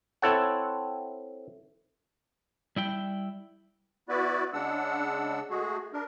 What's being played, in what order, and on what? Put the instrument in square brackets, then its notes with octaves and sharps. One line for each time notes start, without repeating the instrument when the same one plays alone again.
[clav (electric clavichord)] C4 E4 A4 C#5 F#5
[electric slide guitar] G3 E4 G5
[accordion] B3 E4 F#4 B4 D5
C#3 G#3 D4 F#5 E6
G#3 A3 F#4 G#4
D4 A#4